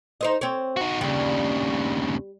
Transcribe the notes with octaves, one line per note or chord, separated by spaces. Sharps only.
D#4 C5 D#5
C4 C#5
D#4 F#4
D#2 C#3 G3